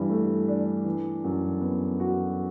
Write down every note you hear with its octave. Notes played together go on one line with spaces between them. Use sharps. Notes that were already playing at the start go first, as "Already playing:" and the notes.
Already playing: G2 E3
A3
D4
E3
F#2
B3
F#4